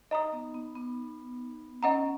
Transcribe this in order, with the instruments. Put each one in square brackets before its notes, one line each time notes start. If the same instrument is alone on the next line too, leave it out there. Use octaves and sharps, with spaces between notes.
[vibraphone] D#4 [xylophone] D#5 A#5 D#6
[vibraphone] B3
B3
B3
[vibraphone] C#4 [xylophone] D#5 F#5 A#5